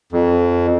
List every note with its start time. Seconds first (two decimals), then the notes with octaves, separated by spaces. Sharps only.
0.13 F2